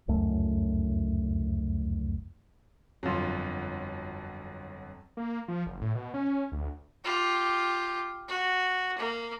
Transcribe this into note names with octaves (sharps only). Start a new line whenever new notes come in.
F1 C#2 F#2 A3
G1 F2 F#3 F4 C6
A#3
F3
F#1
A2
B2
C#4
D2
F4 G4
F#4
A#3